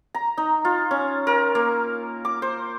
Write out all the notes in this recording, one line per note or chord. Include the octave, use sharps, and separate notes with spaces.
A#5
D#4
F4
C#4
A#4
A#3
D6
C5